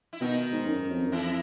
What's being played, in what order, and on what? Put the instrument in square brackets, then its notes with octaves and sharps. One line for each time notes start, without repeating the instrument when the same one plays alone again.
[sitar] E4
[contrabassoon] B2 [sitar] D#3 D#4
[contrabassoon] G#2
F#2
F2
F#2
[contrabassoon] F2 [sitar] E3 E4